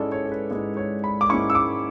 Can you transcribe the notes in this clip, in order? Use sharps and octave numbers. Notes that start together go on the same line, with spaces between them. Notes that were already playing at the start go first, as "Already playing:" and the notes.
Already playing: G#2 G#3 C#4 E4 A4 D5
C#5
A4
B4
G#2 G#3 C#4 E4 B4
C#5
B5
D6
G#2 G#3 C#4 E4 C#6
E6
D6